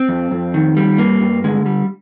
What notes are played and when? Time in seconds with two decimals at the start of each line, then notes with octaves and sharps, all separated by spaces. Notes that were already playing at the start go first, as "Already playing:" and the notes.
Already playing: C4
0.09 F2
0.31 F2
0.54 D#3
0.77 G3
0.98 G2 A#3
1.20 G2
1.44 D3 G#3
1.66 G3